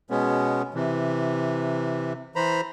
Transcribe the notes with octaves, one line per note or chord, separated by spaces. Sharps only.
B2 G#3 B3 C#4
C3 E3
E3 C5 A#5 B5